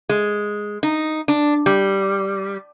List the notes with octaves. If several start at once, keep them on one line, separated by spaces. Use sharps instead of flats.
G#3
D#4
D4
G3